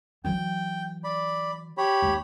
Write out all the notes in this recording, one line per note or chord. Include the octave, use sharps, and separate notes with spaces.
E3 F#3 G5
D5 B5
G4 C#5 B5
D#2